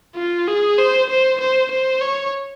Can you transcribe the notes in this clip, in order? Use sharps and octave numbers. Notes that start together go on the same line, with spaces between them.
F4
G#4
C5
C5
C5
C5
C#5